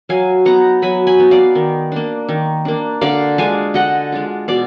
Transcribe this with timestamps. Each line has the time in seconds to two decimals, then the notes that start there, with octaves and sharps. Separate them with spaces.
0.09 F#3 F5 G#5
0.45 B3 D#4 F#5 A#5
0.82 F#3 G#5 B5
1.07 G#5 B5
1.19 B3 D#4
1.31 D5 F5
1.55 D#3
1.92 A#3 D4
2.29 D#3
2.65 A#3 D4
3.01 D3 D5 F5
3.38 G#3 D4 F4 F5 G#5
3.74 D3 D#5 F#5
4.12 G#3 D4 F4
4.48 B2 D5 F5